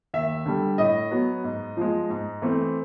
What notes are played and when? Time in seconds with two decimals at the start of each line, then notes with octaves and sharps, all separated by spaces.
0.14 D#2 E5
0.46 D3 G3
0.78 A2 D#5
1.11 F#3 B3
1.44 G#2
1.77 F3 G#3
2.10 G#2
2.42 E3 A3 C4